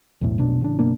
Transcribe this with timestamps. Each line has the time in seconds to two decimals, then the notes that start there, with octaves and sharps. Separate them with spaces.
0.21 B1 E2 A2
0.38 F1 B1 B2 D4
0.61 A1 C#3 D4
0.79 F#1 B2 A#3 D4